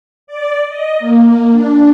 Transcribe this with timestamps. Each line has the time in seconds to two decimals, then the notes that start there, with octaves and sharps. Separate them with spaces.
0.27 D5
0.69 D#5
1.00 A#3
1.52 D4